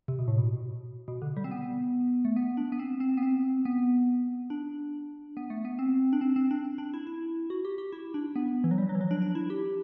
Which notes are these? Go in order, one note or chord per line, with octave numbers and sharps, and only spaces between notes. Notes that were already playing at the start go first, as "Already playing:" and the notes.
C3
B2
A2
B2
B2
D3
G3
C4
B3
A3
B3
D4
B3
C4
C4
B3
C4
B3
D4
B3
A3
B3
C4
D4
C4
C4
D4
D4
E4
E4
F#4
G4
G4
E4
D4
B3
E3
F#3
G3
F#3
E3
F#3
D4
D4
E4
G4